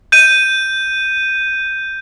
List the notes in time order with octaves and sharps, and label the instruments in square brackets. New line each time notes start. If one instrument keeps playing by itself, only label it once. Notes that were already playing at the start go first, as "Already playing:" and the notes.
[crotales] G6 D#7